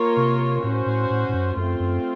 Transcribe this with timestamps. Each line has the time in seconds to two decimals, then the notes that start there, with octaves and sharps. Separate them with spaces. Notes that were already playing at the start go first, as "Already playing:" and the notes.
Already playing: A#3 F4 A#4 C#5
0.17 C3
0.63 A2 C#4 F#4 C5
0.86 A2
1.10 A2
1.29 A2
1.34 F#2
1.56 F#2 A3 C4 F4
1.80 F#2